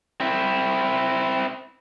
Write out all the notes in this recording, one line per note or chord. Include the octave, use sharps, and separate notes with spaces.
C4 E4